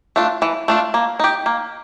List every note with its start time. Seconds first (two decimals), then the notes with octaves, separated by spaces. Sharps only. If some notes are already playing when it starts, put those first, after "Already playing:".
0.16 A3 D4 F4
0.42 E3
0.68 A3 D4 F4
0.94 A#3
1.20 D#4 G4
1.46 A#3